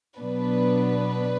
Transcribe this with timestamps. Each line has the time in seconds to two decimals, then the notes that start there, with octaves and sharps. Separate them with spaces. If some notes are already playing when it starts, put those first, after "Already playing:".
0.18 B2 F#3 B3 D4 B4